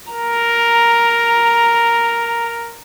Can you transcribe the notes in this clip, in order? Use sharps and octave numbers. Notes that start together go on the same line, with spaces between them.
A#4 A#5